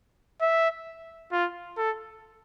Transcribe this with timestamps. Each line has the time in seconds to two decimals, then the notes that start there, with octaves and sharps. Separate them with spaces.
0.42 E5
1.32 F4
1.77 A4